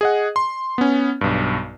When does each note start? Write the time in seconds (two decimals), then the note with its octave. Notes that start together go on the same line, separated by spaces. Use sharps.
0.01 G#4 D#5 F#5
0.36 C6
0.78 B3 C#4
1.21 B1 G2